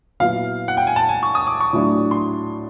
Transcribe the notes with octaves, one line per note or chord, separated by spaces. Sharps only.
A#2 F#3 B3 E4 F5
F#5
G5
G#5
A5
G#5
C#6
D#6
D6
C#6
A2 F#3 A3 D4 F4
C6